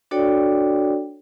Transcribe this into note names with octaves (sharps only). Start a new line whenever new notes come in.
D4 F#4 A4 C#5 D5 G5